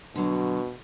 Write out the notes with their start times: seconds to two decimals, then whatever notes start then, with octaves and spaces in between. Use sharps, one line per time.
0.15 B2 D3 F#3